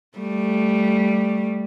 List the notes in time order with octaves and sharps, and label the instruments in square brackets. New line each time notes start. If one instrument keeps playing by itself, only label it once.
[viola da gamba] G3 A3